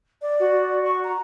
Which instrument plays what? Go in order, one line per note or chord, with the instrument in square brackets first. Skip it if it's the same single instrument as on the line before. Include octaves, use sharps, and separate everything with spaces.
[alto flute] D5
[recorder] F#4
[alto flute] C#6
A#5